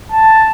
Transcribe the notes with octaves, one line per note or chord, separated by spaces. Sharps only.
A5